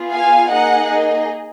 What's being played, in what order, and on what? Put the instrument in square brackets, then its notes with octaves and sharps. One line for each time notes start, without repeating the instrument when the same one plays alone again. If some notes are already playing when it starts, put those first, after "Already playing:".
Already playing: [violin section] B3 F4 G#4
F5 G#5
A#3 D#4 G#4 D#5 F#5
D#5